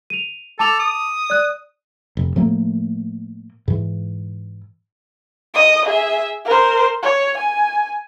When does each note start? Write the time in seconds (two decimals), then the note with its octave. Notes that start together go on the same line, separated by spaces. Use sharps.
0.10 D#7 F7
0.59 A4 A5 D6 F7
0.79 D#6
1.30 D5 F#6
2.17 F1
2.36 A2 F3 A3 A#3
3.68 G#2 E3
5.54 D#5 D#6
5.86 G#4 E5
6.45 A#4 C5
7.03 C#5
7.38 G#5